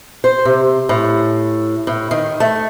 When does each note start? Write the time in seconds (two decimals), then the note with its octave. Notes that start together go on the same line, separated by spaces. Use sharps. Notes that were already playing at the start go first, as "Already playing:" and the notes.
0.24 C5
0.45 C3
0.89 A2
1.87 A2
2.11 D#3
2.40 A3